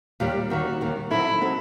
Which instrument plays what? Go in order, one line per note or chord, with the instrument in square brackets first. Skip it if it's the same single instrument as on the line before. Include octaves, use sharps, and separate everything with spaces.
[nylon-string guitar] D#2 D#3 G3 [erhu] G4
[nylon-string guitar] D#2 D#3 G3 [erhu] F#4
[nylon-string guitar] D#2 D#3 G3
[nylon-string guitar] F#3 C4 D#4 A4 [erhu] E4
[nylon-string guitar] F#3 C4 D#4 A4